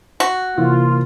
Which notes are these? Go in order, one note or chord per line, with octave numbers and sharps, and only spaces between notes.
F#4
C3 E3 A#3 F4